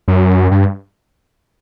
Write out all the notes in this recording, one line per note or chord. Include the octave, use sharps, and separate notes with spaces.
F#2
G2